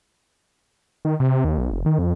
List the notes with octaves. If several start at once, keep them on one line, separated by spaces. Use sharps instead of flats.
D#3
C3
D#2
B1
F1
D#3
F2